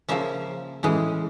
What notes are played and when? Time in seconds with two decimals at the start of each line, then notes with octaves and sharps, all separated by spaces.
0.09 C#3 F3 A#3 C#4 E5
0.83 A2 E3 G#3 C#4